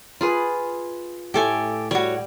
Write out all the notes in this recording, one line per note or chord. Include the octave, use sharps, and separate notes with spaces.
F4 G#4 B4
A2 A3 G4 A4 E5 G#5
G3 F#4 C#5